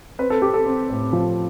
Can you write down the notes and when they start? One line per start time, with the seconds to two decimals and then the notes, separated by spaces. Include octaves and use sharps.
0.19 C4 B4
0.30 A4
0.42 C4 G4
0.54 A4
0.66 C4
0.90 A2
1.13 F3